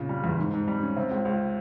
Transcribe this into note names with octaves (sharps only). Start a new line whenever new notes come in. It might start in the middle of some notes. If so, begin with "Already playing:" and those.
Already playing: A#2 C#3
G3
E2
G#2
G#2
G3
C#4
C3
C#2
C#2